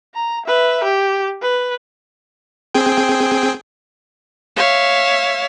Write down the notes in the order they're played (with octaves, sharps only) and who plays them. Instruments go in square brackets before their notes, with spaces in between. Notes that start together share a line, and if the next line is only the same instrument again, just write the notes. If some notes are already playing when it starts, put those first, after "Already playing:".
[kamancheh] A#5
B4 E5
G4
B4
[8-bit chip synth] C4 G#4 G5
[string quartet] C#5 E5 F5